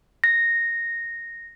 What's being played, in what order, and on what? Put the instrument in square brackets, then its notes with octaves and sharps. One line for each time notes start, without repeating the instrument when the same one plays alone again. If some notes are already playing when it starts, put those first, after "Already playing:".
[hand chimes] A#6